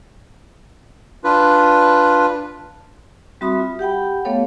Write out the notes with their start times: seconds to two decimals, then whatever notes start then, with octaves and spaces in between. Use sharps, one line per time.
1.24 D4 F4 B4
3.41 G3 C4 F#4 E5 B5 D#6
3.60 F4
3.79 G4 F#5 G5 B5
4.25 A3 B3 A4 C#5 F5